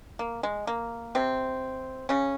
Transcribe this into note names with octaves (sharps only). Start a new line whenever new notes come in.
A#3
G#3
A#3
C3 C4
C#3 C#4